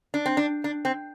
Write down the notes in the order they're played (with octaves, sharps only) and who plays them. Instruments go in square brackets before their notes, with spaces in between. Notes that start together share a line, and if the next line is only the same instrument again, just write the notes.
[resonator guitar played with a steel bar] D4
C4
D4
D4
C4